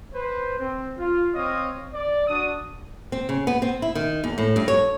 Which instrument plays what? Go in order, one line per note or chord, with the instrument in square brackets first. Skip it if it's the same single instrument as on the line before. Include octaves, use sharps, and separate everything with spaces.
[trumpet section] B4 C5
C4
F4
C4 C#5 D#5 F5 D#6
D5
D4 F#4 D5 D#6
[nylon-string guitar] C4
C#3
B3
C4
E4
D#3
E2
A2
G2
C#5